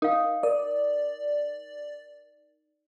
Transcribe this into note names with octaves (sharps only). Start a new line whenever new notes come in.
D#4 A#4 F5
A#4 D5